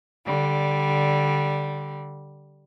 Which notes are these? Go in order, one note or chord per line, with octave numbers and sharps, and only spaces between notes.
D3 G3